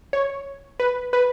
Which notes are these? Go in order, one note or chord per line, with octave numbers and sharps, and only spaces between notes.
C#5
B4
B4